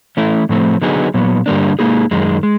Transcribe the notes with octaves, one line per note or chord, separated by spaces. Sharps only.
E3 A3 C#4 E4
A2 F3 A3 C4
D3 F#3 B3 D#4 G#4
A#2 F#3 B3
G2 D3 G3 A#3 D4
G#2 F3 A#3 D#4 G#4
F#2 D#3 G#3
G#3